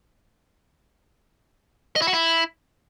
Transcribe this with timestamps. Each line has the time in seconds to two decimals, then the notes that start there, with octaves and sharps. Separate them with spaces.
1.96 D#5
2.02 E4
2.07 F#4
2.13 E4